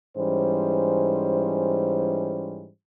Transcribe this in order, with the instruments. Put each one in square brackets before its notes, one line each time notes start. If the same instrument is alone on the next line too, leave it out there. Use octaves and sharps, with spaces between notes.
[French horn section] G#2 E3 G3 C#4 C5